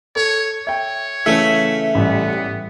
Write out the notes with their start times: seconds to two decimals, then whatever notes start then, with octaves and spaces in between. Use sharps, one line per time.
0.16 A4 C#5
0.67 C#5 E5 G5
1.26 C#3 E3 A3 C#4 E5
1.95 A1 G3 B3